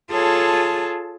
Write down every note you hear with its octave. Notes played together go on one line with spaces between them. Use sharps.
F4 G#4 A4 C#5 A5